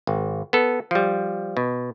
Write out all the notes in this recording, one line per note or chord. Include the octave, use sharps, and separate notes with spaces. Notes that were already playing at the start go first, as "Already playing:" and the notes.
G#1
B3 A4
F3 G3
B2